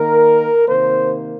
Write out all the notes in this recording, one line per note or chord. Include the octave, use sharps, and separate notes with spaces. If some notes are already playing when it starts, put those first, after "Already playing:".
Already playing: D#3 A#3 A#4
C3 D#3 A#3 C5